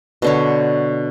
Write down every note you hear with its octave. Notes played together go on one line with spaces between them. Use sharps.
B2 D3 C#5